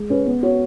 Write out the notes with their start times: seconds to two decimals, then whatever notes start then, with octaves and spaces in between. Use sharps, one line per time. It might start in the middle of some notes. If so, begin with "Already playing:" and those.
Already playing: G#3
0.10 C#4 B4
0.27 B3
0.43 F#4 C#5